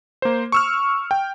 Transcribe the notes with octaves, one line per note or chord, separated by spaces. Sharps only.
A#3 C5
C#6 E6 F6
G5